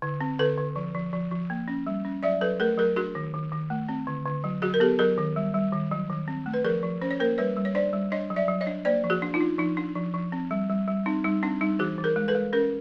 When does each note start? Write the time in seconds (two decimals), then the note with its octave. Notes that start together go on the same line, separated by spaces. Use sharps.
0.02 D3
0.21 C4
0.39 D3 A4 B4
0.58 D3
0.76 F3
0.94 F3
1.13 F3
1.31 F3
1.50 A#3
1.68 C#4
1.87 G3
2.05 C#4
2.23 F#3 D5 E5
2.41 F#3 A4 B4
2.60 A3 G#4 A#4
2.78 F#3 G#4 A#4
2.96 D4 F#4 G#4
3.15 D#3
3.34 D#3
3.52 D#3
3.70 A3
3.89 C4
4.07 D3
4.25 D3
4.44 F#3
4.62 F#3 F#4 G#4
4.74 A#4
4.80 B3 G4 A4
4.99 F#3 G#4 A#4
5.18 D#3
5.36 G3
5.54 G3
5.73 D#3
5.91 F#3
6.09 D#3
6.28 C4
6.46 A3
6.54 B4
6.65 F3 G#4 A#4
6.83 F3
7.02 C#4 C5
7.11 C#5
7.20 A#3 A#4 C5
7.38 G3 B4 C#5
7.57 G3
7.65 C#5
7.75 D4 C5 D5
7.93 G3
8.12 D4 C#5 D#5
8.30 F#3
8.36 D5 E5
8.48 F#3
8.61 C#5 D#5
8.67 D4
8.85 A#3 C5 D5
9.04 F3
9.10 F#4 G#4
9.22 D4
9.34 D#4 F4
9.41 D4
9.58 F3 D#4
9.77 D4
9.95 F3
10.14 F3
10.32 C4
10.51 G3
10.70 G3
10.88 G3
11.06 C4 D#4
11.24 G3 D#4
11.43 C4 D4
11.61 G3 D#4
11.79 E3 F#4 G#4
11.98 E3
12.04 G#4 A#4
12.16 G#3
12.28 A4 B4
12.35 G#3
12.53 C#4 G#4 A#4